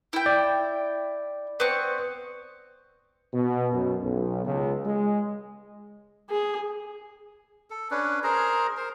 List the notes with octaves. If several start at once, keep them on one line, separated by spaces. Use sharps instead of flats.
E4 G5
D5
B3 C4 C#6
B2
F#2
B1
C#2
G#3
G#4
A4
C#4 D4 B4
G#4 A#4 C5 A#5
A#4 C5